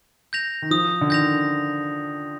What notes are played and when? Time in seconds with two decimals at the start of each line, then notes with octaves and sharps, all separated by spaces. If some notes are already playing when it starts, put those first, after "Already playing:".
0.33 G6 A#6 F7
0.62 D#3
0.71 F3 D#6
1.01 D3
1.10 D#3 G6 A#6 F7